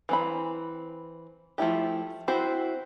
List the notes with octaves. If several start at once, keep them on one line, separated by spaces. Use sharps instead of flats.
E3 C4 B5
F3 A3 E4 G4
C4 E4 F#4 C5